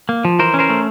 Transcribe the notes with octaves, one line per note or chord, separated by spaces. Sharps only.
A#3
F3
E3 A#4 C5
C#4
A#4 C5
A3